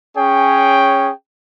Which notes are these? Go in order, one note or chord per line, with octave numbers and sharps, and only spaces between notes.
C#4 G#4 C#5 G5